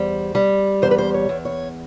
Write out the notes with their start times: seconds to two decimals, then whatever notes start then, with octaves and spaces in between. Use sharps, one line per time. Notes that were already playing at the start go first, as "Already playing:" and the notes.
Already playing: E2 G3 C5
0.35 G3
0.82 E2 C5
0.91 B4
0.98 C5
1.14 C#5
1.29 E2
1.45 C#5